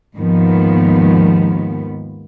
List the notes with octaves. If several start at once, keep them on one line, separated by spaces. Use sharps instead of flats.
D#2 G#2 D#3 F3 B3